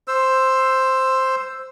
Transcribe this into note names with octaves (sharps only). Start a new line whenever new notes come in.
C5 E6